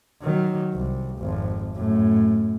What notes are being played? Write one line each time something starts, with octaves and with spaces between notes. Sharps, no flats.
D#3 F#3
C2
G#1 F2
F#2 A2